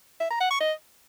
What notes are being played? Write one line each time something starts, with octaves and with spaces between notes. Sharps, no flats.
E5
A#5
F#5
C#6
D#5